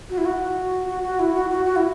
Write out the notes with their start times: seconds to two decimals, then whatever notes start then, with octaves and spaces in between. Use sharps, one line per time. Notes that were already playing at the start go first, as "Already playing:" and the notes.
0.10 F#4
0.18 E4
0.25 F#4
0.88 F#4
1.03 F#4
1.19 E4
1.35 F#4
1.50 F#4
1.65 F#4
1.76 E4